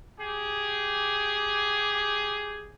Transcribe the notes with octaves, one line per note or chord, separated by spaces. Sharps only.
G4 G#4